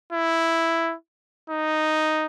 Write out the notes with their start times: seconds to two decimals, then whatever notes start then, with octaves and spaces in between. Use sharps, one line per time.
0.13 E4
1.50 D#4